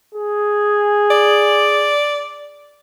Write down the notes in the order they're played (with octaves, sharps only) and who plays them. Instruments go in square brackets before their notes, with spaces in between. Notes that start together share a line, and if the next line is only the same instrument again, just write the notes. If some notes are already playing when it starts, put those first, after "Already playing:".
[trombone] G#4
[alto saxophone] D5